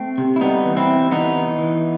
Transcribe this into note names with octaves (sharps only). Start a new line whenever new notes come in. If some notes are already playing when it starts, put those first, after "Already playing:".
Already playing: A3 C4
C3
E4
G3 B3 D#4
E3
C4 E4
C3
E3 B3 D#4
E3
E3